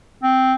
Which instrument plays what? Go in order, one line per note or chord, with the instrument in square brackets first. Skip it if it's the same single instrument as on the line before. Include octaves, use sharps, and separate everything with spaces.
[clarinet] C4